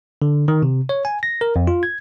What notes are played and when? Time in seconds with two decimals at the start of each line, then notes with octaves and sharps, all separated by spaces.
0.22 D3
0.48 D#3
0.63 C3
0.89 C#5
1.05 G#5
1.23 A#6
1.41 A#4
1.56 F2
1.67 F4
1.83 G#6